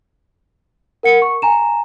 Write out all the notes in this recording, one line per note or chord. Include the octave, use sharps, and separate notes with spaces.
A#4 F#5 C#7
C#6
G#5 A#5 E7